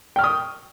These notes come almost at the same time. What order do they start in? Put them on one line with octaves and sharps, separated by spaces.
G5 F6 C#6 D#6